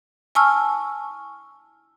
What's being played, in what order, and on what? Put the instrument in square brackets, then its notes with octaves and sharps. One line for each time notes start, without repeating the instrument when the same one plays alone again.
[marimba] G#5 A5 C#6 E6 F6